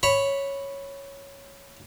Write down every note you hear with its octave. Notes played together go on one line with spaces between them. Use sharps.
C#5 B5